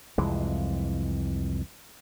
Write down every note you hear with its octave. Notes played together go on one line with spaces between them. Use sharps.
C2 F2 E3 G#3